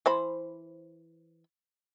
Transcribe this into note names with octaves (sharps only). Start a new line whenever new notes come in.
E3 C5 B5